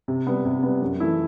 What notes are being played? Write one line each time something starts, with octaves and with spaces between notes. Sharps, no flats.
C3
G3 B3
C3
G3 B3
F#2
E3 A3 E4